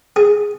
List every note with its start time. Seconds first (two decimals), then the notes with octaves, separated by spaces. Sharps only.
0.16 G#4